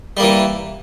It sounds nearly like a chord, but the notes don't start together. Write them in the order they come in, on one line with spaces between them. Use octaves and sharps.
G3 A#3 E3